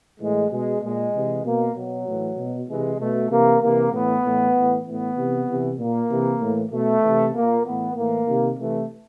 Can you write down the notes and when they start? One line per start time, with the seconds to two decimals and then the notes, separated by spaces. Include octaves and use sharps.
0.20 A2 E3 G#3
0.51 B2 G#3
0.82 A#2 G#3
1.13 C3 E3
1.44 B2 A#3
1.75 B2 F#3
2.06 A2 E3
2.37 B2
2.68 C3 E3 G#3
2.99 B2 A3
3.30 C3 E3 A#3
3.61 C3 E3 A#3
3.92 A2 E3 B3
4.24 A2 E3
4.55 A2 E3
4.86 A2 E3 B3
5.16 C3 E3
5.47 C3 E3
5.78 A#2 A#3
6.09 C3 E3
6.40 A2 E3
6.71 B2 A3
7.02 C3 E3
7.33 A#2 A#3
7.64 A2 E3 B3
7.95 A2 E3 A#3
8.27 C3 D#3
8.57 C3 E3 A3